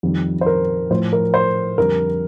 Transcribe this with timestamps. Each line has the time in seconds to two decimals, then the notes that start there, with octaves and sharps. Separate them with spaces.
0.03 F2 D#3 G3
0.41 C5
0.46 A#4
0.90 A2 F3 C5
1.13 A#4
1.34 C5
1.78 F2 D3 G3 A#4